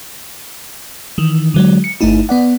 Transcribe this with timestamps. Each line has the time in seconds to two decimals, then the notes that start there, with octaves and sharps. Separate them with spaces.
1.18 D#3 E3
1.54 D3 F#3 G#3
1.84 C#7
2.01 G1 A3 D#4 E4
2.29 B3 D5 F#5